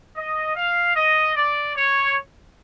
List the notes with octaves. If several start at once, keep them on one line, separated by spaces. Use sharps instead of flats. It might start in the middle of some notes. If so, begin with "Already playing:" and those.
D#5
F5
D#5
D5
C#5